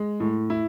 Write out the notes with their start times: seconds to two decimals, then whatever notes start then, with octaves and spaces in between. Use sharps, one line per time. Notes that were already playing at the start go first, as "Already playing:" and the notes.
Already playing: G#3
0.20 A2
0.50 E4